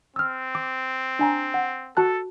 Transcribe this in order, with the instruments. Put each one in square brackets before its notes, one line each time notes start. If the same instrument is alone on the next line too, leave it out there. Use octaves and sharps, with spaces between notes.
[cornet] C4 [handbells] E6 F6
[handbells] D6
D4 G#5 A#5
F#5
[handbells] F#4 A5 F#6 [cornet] A4